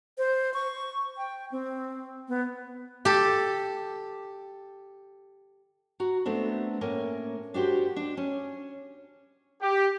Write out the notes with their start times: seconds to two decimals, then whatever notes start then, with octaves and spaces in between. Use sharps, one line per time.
0.18 C5
0.54 C#6
1.17 G5
1.52 C4
2.28 B3
3.05 G4 A4
6.00 F#4 A#5
6.25 A3 B3 C4 D4
6.81 A2 A#3 C#4
7.54 D4 F#4 G4 C5
7.96 D4
8.17 C#4
9.60 G4